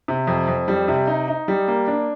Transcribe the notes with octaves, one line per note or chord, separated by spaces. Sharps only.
C3
F2
F2
G3
C3
D#4
D#4
G3
A#3
D4